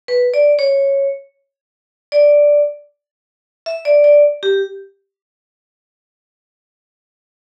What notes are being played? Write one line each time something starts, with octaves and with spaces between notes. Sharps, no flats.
B4
D5
C#5
D5
E5
D5
D5
G4